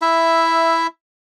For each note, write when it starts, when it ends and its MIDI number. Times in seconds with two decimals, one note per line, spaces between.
0.02 0.87 64
0.02 0.87 76